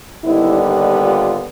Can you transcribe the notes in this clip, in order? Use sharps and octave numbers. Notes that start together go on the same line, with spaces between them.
D#2 D3 G3 B3 D#4 E4
D#4
F4